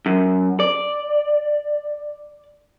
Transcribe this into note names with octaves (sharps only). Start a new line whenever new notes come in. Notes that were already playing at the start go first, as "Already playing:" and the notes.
F#2
D5